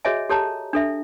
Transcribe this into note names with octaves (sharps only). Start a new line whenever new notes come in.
F#4 G#4 C#5 D#5 E5 G#5
G4 A4 C#5 A5 A#5
D4 A4 E5